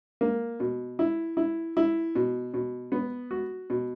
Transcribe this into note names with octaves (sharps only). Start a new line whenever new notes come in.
A#3
B2
E4
E4
E4
B2
B2
B3
F#4
B2